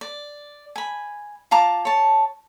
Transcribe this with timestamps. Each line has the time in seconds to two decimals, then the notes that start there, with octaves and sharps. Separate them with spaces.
0.01 D5
0.76 G#5 B5
1.51 F4 A5 A#5 D6
1.85 C#5 A5